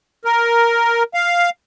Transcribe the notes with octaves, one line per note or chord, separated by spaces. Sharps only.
A#4
F5